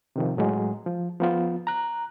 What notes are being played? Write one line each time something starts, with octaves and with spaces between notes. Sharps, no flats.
C3 D#3 F3
A2 F#3 G#3
F3
F3 B3 F4
A#5 F#6